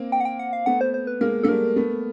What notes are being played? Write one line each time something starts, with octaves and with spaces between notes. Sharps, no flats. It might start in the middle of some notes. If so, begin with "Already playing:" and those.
Already playing: A#3 C4
G5
F#5
G5
F#5
F5
A3 B3 F#5
C5
C5
B4
G#3 A#3 A#4
A#3 A4
G3 A3 A#4
A3 B3